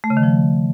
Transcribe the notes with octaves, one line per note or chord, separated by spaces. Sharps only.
A3
C#3
D#3
F3